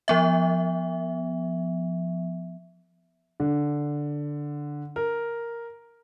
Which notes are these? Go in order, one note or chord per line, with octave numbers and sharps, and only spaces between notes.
F3 B3 E5
D3
A#4